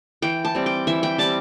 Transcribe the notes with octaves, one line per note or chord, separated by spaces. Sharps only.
E3 G5
A5
G3 C4
G5
E3 E5
G5
G3 C4 A5